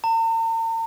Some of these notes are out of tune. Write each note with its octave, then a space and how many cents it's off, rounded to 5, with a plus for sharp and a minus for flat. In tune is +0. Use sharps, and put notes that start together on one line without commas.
A#5 -45